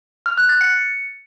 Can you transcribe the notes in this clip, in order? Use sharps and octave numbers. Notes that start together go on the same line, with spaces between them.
F6
F#6
A6
C#7